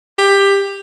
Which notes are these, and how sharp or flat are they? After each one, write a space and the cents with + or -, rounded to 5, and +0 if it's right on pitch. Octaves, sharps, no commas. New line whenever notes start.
G4 +15